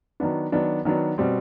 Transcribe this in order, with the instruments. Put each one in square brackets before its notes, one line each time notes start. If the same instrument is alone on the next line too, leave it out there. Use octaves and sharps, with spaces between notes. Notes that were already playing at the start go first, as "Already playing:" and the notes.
[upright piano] D#3 F#3 B3 D4
D#3 F#3 B3 D4
D#3 F#3 B3 D4
B2 G3 C4